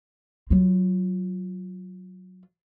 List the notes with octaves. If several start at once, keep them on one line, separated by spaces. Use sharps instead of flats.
F#3 F4